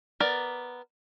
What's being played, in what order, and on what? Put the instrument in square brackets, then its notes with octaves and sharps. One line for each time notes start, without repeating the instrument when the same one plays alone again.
[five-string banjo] B3 A#4 D5